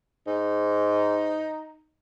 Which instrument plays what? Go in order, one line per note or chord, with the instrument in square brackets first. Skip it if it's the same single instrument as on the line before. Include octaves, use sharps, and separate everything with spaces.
[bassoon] G#2 [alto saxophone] D#4